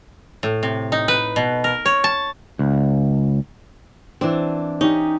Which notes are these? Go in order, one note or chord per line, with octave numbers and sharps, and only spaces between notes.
A2
C3
D#4
B4
B2
A#4
C#5
A5
C#2
E3 C4 D4
C#4 D#4 G4